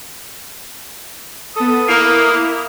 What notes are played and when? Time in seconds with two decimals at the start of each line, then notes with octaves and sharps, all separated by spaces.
1.56 B3 A4 D#6
1.88 A#3 E4